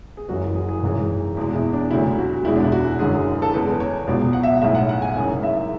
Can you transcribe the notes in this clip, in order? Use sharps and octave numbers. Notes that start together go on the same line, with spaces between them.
G#4
F#1 F#2 E3 F#4
F#4
G#4
G#4
G#1 F#2 E3 G#3
E2 B2 G#3
E4
D4
D2 C#3 F#3 E4
F#4
F#4
E1 E2 C#3 G#3 E4
D4
E4
F#4
F#1 F#2 D3 G#3 G#4
A4
E2 C#3 G#3 B4
C#5
C#2 B2 F#3 D5
F#5
E5
B1 A2 G#3 E5
F#5
F#5
G#5
F#1 F#2 C#3
E5